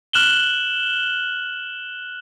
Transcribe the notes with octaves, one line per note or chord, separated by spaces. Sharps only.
F6 F#6 E7 F#7 G7